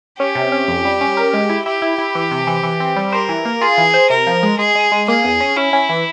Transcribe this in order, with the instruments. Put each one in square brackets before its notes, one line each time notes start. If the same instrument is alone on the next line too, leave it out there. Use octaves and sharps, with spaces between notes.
[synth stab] C#4 [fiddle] G4
[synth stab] C3
C#4
F2
G3
C#4
A#4
G#3
E4
[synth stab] E4 [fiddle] G4
[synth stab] E4
E4
E3
C3
E3
E3
C4
G3
[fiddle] A#4 [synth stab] C5
[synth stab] E3
A#3
[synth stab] F4 [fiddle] G#4
[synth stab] E3
C5
[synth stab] C3 [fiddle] A#4
[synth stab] F3
G#3
[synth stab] G#3 [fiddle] G#4
[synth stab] G#3
G#3
[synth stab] A#3 [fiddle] G#4
[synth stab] E2
C#4
[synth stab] C#4 [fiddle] E4
[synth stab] C#4
E3